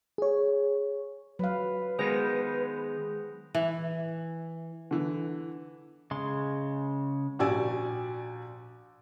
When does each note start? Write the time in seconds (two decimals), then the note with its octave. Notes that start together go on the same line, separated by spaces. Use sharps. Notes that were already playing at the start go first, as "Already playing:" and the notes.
0.18 G#4 C#5
1.39 F#3 B4 F5
1.99 D#3 G#3 B3 G#4 C5 A#6
3.55 E3
4.91 D3 E3
6.11 C#3 G#3 C6
7.39 A#1 F#4 G4 D5 G#5 E6